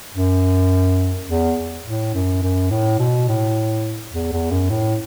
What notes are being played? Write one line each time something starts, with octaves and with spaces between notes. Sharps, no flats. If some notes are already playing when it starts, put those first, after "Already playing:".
F#2
E2
A2
F#2
F#2
A2
B2
A2
E2
E2
F#2
A2